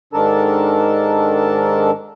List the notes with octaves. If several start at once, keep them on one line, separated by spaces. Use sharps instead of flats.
G#2 D#3 D4 A4 A#4 A5